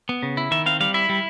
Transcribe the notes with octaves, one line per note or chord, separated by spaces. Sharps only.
B3
C#3
E4
D#3 E5
C4 F5
G3 F5
E4 E5
G3